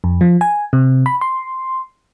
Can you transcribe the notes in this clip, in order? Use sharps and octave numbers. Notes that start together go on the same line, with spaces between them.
F2
F3
G#5
C3
B5
C6